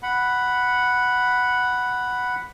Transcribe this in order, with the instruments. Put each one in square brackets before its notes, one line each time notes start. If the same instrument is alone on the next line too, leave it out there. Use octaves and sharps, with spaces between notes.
[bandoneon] F#5 B5